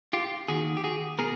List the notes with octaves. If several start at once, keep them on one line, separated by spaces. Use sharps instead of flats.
F4 G4
D#2 D#3 F#4 G#4
G4
F#4 G#4
B2 G#4 A#4